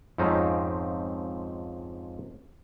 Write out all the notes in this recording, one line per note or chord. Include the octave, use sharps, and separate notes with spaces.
F2 G#2 F3 C4 C#4 D#4